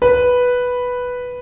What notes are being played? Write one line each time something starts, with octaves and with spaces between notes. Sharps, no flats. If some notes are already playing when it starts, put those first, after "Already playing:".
B4